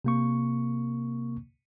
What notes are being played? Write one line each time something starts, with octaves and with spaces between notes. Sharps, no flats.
C3 A#3 C#6